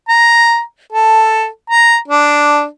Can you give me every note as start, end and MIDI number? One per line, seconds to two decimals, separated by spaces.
0.09 0.61 82
0.93 1.47 69
1.70 1.97 82
2.08 2.65 62